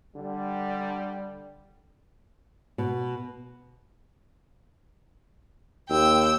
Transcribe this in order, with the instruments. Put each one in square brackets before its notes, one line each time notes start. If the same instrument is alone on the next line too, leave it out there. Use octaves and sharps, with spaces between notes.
[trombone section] D3 G3
[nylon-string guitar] B2
[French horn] D#2 [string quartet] G5 E6